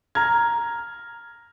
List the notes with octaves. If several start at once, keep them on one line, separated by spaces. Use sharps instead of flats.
A#5 F6 G#6